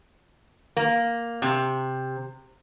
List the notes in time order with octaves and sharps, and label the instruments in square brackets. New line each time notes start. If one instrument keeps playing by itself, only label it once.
[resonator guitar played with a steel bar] A#3
C3